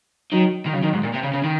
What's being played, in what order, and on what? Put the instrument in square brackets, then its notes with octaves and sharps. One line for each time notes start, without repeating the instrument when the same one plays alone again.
[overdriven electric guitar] D#3 [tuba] F#3
[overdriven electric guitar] D#3
[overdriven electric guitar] C#3 [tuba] F#3
[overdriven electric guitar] D#3
G#2
A#2
C3
C#3
C#3
D#3